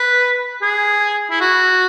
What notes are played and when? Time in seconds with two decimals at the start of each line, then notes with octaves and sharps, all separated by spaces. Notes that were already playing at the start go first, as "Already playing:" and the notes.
Already playing: B4
0.62 G#4
1.30 E4
1.41 F#4